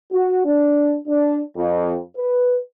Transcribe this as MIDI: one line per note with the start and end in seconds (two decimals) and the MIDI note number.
0.12 0.44 66
0.45 0.96 62
1.08 1.42 62
1.56 1.98 41
2.17 2.57 71